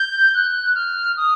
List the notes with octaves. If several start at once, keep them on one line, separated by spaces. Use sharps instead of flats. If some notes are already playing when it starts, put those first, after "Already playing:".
Already playing: G6
F#6
F6
D#6